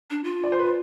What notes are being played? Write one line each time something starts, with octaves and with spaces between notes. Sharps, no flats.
D4
F4
D5
C5
B4